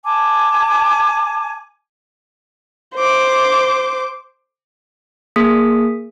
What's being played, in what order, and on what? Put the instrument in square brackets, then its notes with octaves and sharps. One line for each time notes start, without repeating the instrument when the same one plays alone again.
[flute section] G#5 A5 D6
[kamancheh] C5 D6
[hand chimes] A#3 G#4 D#6 B6